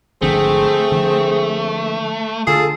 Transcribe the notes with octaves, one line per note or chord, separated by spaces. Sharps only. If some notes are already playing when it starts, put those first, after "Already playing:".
G#1 D3 F3 A3 C4 G#4
D3 F3
D3 F4 G#4 A4